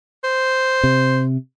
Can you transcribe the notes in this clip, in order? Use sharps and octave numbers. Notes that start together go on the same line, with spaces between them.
C5
C3